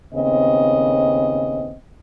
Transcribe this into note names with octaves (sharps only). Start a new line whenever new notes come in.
D#2 C#3 B3 C4 D#5